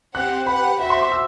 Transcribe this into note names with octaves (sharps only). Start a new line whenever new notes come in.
C4 G4 C5 F#5 F#6
G4 B4 F#5 B5
F#4 C5 E5 F#5
C6
D6
E6